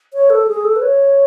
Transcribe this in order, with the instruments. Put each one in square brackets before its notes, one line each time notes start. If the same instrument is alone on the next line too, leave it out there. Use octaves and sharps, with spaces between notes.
[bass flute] C#5
A4
G#4
A4
B4
C#5